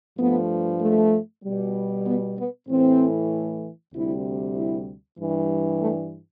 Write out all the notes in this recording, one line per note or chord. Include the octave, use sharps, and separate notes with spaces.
G2 F3 A3 B3
A3
B2 G3
B3
B3
A2 E3 A3 C4
D2 C3 G3 E4
E4
G2 E3 G3
A3